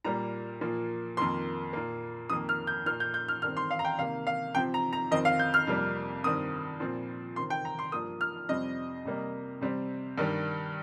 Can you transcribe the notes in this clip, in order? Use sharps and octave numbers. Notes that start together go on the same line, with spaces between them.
A#2 G3 A#3 A#5
A#2 F3 A#3
F2 D#3 A#3 C6
A#2 A#3
F2 D#3 A#3 D#6
F6
G6
A#2 A#3 F6
G6
G6
F6
G2 D#3 C4 F6
C6
F5
A#5
G5
C3 D#3 A#3 F5
F5
C3 F3 C4 G5
A#5
A#5
F2 D#3 C4 D#5
F5
G6
F6
F2 C3 G3 A#3
G2 D#3 C4 D#6
A#2 F3 C4
C3 D#3 C4 C6
G5
A#5
C6
G2 F3 A#3 D#6
F6
F2 C3 G3 C4 D#5
C3 G3 A#3
C3 G3 C4
G2 D#3 G3